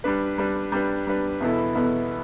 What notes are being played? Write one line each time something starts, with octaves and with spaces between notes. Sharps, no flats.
G3 D4 B4
G3 D4 B4
G3 D4 B4
G3 D4 B4
E2 B2 B3 E4 A4
E2 B2 B3 E4 A4